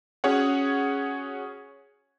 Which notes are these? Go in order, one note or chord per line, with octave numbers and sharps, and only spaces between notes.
C#4 F#4 G#4 C#5 F#5